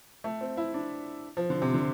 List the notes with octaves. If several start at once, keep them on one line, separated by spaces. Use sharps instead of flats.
A3
C4
E4
D4
F3
D3
C3
D3